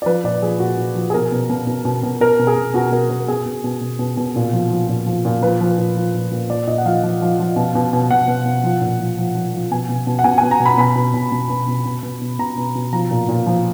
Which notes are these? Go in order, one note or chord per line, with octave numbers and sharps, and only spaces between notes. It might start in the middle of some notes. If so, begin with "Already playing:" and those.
D5
F3 B4
A#2 D5
F3 G#4
A#2 F#4
A#2
F3
G#4
B2 A#4
B2
B2
B2
B2
B2
B2 A#4
B2
G#4
B2
B2 F#4
B2 A#4
B2 A#4
B2 G#4
B2
B2
B2
B2
B2
A#2
F3
F3
A#2
F3
A#2
F3 B4
F3
A#2
F3
A#2
A#2
A#2 D5
A#2 D#5
F#5
F3 F5
F3
F3
F3
B2
B2
B2
B2 F#5
B2
B2
F3
A#2
F3
F3
F3
F3
B2 G#5
B2
B2
F#5
B2 G#5
B2 G#5
A#5
B2
B5
B2 B5
B2
B2
B2
B2
B2
B2
B2
B2
B2 A#5
B2
B2
F3 A#5
A#2
A#2
F3